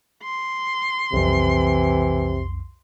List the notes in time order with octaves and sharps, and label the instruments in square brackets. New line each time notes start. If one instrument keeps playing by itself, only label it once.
[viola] C6
[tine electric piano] B1 F2 [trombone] C3 [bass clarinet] E3